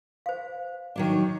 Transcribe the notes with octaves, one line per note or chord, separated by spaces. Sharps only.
C5 F5
D#3 F#3 D4